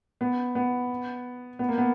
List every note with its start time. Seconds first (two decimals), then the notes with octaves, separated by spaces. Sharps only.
0.21 B3
0.55 B3
1.59 B3
1.69 A#3
1.78 B3